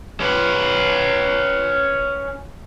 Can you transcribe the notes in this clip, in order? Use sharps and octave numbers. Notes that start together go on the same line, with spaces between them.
C#4 B4